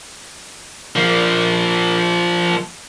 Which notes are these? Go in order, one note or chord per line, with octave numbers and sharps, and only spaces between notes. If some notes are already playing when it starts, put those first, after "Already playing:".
F3 A#3